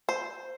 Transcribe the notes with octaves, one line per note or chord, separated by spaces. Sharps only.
C5